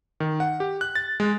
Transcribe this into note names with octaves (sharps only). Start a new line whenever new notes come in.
D#3
F#5
G4
F#6
A6
G#3